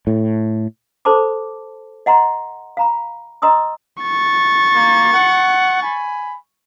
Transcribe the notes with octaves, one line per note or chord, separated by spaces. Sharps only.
A2
A4 C5 A5 B5 D6
D#5 F#5 A#5 C6
F5 A#5 B5
D#5 A#5 C6 D#6 E6
C#6 A6
A#3
F#5
G#5 B5